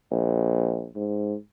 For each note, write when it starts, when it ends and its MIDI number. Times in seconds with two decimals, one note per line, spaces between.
0.12 0.88 34
0.96 1.34 44